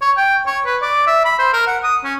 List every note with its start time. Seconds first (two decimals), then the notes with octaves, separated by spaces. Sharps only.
0.02 C#5
0.17 G5
0.47 C#5
0.66 B4
0.82 D5
1.07 E5
1.24 B5
1.39 C5
1.53 A#4
1.67 F#5
1.84 D#6
2.04 C#4